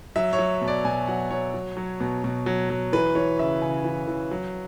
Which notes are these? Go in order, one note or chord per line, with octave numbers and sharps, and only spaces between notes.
F#3 E5
C#5
F#3
B2
D5
B2 G#5
F#3 F#5
F#3 C#5
F#3
F#3
B2
B2
F#3
F#3
E3 B4
E3 C#5
C#3 E5
C#3 G#5
E3
E3
F#3